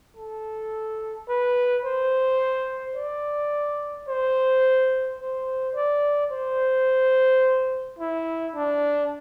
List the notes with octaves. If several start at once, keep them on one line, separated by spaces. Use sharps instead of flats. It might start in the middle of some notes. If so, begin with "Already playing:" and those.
A4
B4
C5
D5
C5
C5
D5
C5
E4
D4